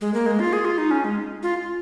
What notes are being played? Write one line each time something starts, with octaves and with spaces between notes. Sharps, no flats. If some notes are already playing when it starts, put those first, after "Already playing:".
G#3
A#3
G#3
F4
G#4
F4
D#4
C#4
G#3
F4